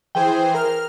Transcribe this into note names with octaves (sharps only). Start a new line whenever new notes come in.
E3 G#4 C5 G5
A#4 F6